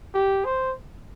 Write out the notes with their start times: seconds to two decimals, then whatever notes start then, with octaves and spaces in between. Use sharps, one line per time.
0.15 G4
0.45 C5